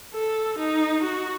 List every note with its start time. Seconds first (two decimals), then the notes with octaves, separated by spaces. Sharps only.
0.13 A4
0.59 D#4
1.03 F#4